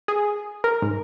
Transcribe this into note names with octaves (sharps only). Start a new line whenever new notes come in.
G#4
A#4
G#2